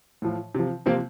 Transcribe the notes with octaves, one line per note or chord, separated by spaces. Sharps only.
A2 F3
C3 F3
C3 F3 A#3 C4